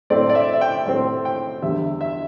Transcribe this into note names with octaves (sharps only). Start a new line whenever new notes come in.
A2 A3 C4 D5
D5
E5
E5
G5
A2 A3 C4 G5
G5
E2 D3 G3 E5
E5